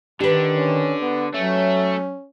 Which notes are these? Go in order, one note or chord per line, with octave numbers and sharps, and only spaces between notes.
D3 D#3 G4 B4
C#4
B3
F#3 A3 C#4